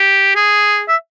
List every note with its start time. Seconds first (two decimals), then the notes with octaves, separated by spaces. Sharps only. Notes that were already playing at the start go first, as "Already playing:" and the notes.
Already playing: G4
0.35 G#4
0.88 E5